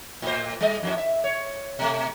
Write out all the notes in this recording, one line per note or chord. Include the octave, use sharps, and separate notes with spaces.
A2 C5
G3 D#5
F2 A2
E5
C#5
B2 A3